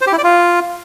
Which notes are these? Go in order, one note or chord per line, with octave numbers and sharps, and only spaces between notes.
C5
G4
E4
D5
F4